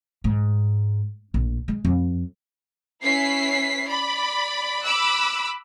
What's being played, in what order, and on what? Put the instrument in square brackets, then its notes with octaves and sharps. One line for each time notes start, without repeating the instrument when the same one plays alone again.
[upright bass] G#2
A#1
G#3
F2
[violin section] C#4 E4 B4 B6 C7
D5 B5
B5 D6 E6 F#6